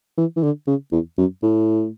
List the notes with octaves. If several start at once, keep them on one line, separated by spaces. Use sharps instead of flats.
E3
E3
D3
C#3
E2
F#2
A2